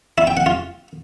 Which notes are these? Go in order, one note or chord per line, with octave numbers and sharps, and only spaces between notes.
E4
G5
F#5
F4